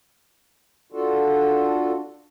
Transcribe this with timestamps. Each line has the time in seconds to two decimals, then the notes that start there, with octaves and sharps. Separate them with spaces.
0.92 D4 F4 F#4 A4